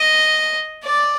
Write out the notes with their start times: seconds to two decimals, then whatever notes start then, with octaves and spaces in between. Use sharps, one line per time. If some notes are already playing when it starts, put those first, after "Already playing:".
Already playing: D#5
0.84 D5